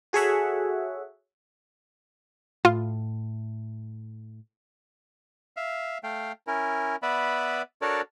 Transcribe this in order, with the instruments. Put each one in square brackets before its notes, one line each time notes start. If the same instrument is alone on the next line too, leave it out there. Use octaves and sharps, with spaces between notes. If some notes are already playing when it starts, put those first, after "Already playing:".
[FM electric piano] F#4 G#4 A4 C#5 E5 F#5
[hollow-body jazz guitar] A2 [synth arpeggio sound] F4
[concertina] E5 F5
A3 F5 G5
C#4 E4 A#4
B3 B4 D5 E5 B5
D4 F#4 A4 A#4 C#5 D5